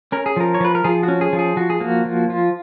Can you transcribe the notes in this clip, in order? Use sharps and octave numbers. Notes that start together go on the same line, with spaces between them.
C#4 A#4
G#4
F3 A#4
C#5
F3 B4
A#4
F3 G#4
F#4
C#4
G#4
F3
G#4
F3 F#4
G#4
A#3 F#4
F3
F3 F4